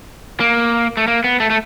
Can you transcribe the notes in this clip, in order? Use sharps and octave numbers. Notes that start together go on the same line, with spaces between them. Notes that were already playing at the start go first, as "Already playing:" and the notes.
A#3
A3
A#3
B3
A3
A3